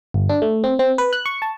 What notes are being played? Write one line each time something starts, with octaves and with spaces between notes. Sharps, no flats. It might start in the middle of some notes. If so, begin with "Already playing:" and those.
G1
D4
A3
C4
C4
B4
F#6
C#6
A5